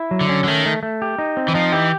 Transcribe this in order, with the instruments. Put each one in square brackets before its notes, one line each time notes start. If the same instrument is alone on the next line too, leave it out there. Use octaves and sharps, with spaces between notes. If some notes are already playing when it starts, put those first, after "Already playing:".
Already playing: [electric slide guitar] E4
F#3
[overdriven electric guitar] D3
[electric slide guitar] C#4
[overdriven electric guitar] D3
[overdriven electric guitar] D#3 [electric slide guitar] A3
[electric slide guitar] A3
A3
G4
D#4
C4
[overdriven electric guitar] E3
[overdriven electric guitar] F3 [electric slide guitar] D#4
[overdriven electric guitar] E3 [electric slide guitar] G4